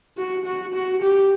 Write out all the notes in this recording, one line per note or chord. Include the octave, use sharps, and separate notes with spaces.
F#4
F#4
F#4
G4